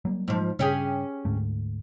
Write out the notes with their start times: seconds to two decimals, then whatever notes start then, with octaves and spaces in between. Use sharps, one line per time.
0.05 F#3 G3 A#3
0.28 G#2 F3
0.59 G2 C#3 C#4 G4 G#4
1.25 D2 G#2 A3